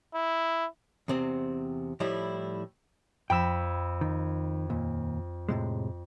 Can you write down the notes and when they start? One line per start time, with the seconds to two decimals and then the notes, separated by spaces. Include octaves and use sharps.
0.14 E4
1.08 E2 C3 C4
2.00 A2 F3 G3 E4 G4 D#5
3.30 F2 G5 B5 E6
4.01 D#3
4.70 D#2 A#2
5.49 A2 C3 G#3